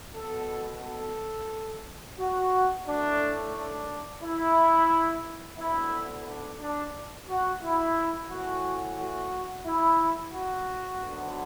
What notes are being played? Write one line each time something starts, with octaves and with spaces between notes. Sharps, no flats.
B2 B3 A4
A4
F#4
A2 A3 D4
D4
E4
D2 D3 B3 E4
D4
D4
F#4
E4
A2 E3 A3 F#4
F#4
E4
F#4
D2 D3 F#3 B3